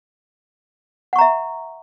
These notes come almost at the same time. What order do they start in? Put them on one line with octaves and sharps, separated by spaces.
F#5 C#6 A#5 E5